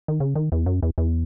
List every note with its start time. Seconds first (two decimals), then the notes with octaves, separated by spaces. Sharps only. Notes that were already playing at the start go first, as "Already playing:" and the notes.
0.08 D#3
0.20 C#3
0.36 D#3
0.52 E2
0.66 F#2
0.83 E2
0.98 E2